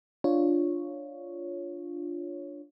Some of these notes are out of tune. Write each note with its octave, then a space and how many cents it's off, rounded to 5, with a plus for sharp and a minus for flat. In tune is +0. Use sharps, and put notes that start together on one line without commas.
D4 +0 F4 +0 C#5 +0